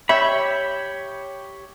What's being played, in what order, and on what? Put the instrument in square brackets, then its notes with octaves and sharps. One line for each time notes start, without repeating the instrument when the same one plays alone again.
[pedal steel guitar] G4 C#5 B5 [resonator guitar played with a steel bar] E5